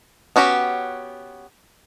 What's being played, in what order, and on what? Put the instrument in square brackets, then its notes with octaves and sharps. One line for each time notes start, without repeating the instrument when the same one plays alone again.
[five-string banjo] B3 C#4 F#4 G4